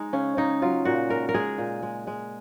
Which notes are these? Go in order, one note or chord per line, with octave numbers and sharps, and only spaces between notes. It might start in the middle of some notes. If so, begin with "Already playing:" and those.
Already playing: G#3 D#4
C#3 C#4
C#3 D#4
F#3 F4
A#2 F#4
G#3 A#4
A#4
G#3 G#4
A#2
G#3
G#3